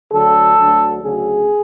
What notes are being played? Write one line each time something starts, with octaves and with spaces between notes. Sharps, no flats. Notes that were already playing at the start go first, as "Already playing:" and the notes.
D2 D3 F#3 A4
D2 D3 F#3
D2 C#3 F#3 G#4